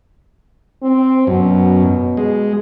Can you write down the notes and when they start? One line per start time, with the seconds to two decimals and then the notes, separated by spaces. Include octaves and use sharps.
0.83 C4
1.27 F#2 B2
2.17 G#3